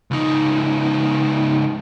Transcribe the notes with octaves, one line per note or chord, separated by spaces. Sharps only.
C#2 D#4